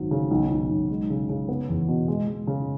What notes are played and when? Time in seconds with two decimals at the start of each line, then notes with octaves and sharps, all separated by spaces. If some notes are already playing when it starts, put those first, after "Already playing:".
Already playing: G#1 F#3
0.11 C#3
0.31 B1
0.50 B1
0.70 B1
0.90 G#3
1.10 C#3
1.29 C#3
1.49 B3
1.69 E2
1.88 B2
2.08 G#3
2.27 G#3
2.47 C#3